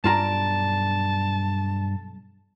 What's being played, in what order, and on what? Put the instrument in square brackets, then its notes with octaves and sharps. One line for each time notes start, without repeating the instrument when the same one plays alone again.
[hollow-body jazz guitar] B1 F4 A#5 [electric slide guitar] G2 D4 D5 [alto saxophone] A5